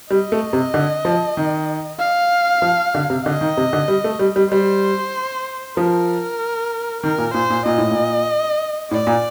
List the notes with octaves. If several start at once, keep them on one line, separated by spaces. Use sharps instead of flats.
G3 D#5
A3
C3
D3
F3
D#3
F5
F3
D3
C3
D3 D#5
D#3
C3
D3
G3
A3
G3
G3
G3 C5
F3 A#4
D#3 A#4
A#2
A#2 C5
A#2
A#2 D#5
A2
A#2
A2 D5
A#2